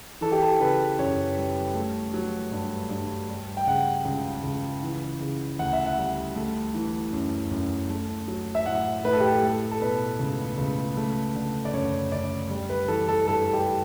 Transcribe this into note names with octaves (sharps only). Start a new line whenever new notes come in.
E3 A4
G4
A4
C#3 B4
F#2 C#5
G3
A3
F#3
G2
G2
G3
G5
C#3 F#5
C#2
C#2
E3
C#3
D2 F#5
E5
F#5
G3
A3
E3
F#2
F#2
A3
F#3
E5
A2 F#5
A2 B4
A4
G4
A4
A3 A4
A4
B2 B4
C#2
C#2
A3
D3
D5
F#2 C#5
F#2 D5
G3
B4
E3 A4
A4
G2 A4
G4